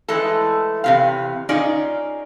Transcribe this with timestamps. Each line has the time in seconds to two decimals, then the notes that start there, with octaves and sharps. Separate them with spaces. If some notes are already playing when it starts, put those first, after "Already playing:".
0.08 E3 G#3 A3 A4
0.84 E2 C3 F5
1.49 C#4 D#4 F4 G#4 D5